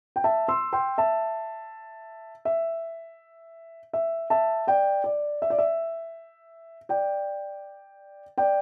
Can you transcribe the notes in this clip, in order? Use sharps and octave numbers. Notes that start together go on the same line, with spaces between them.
G5
E5 A5
C6 E6
G5 C6
E5 A5
E5
E5
E5 A5
D5 G5
D5
E5
D5
E5
D5 G5
D5 G5